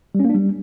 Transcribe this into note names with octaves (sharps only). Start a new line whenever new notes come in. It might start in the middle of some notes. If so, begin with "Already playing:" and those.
G3
C#4
A#3
D4
G3